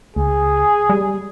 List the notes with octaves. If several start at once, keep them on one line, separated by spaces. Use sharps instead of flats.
C#2 G#4
G3